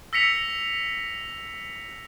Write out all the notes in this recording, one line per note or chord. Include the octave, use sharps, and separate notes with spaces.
E6 A#6 B6 C#7 F7